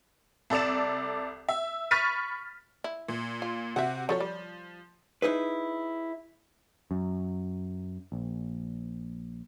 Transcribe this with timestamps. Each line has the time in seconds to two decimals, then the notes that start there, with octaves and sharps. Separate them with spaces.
0.50 C2 A4 D5 D6 E7
1.49 E5
1.91 B5 C#6 F6 A6 B6 D#7
2.84 E4
3.08 A#2
3.42 F4
3.76 C3 C4 F#4 E5 F#5
4.09 F3 F#3 A4 C#5
4.20 G3
5.22 D#4 E4 G#4 B4
6.91 F#2
8.12 A#1